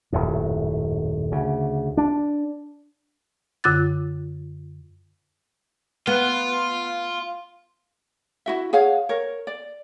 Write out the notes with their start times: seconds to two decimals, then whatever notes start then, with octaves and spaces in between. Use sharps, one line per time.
0.13 D#1 F#2 A2
1.32 D2 C#3
1.97 D4
3.64 F#2 D3 F4 D6 F#6 A6
6.07 B3 F4
8.46 E4 F#4 E5
8.73 G#4 C#5 F5 F#5
9.09 A#4 C#5
9.47 D5